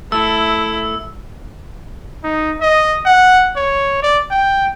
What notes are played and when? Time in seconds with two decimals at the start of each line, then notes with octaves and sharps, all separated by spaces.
0.12 A3 E4 E6
2.24 D#4
2.61 D#5
3.05 F#5
3.56 C#5
4.02 D5
4.31 G5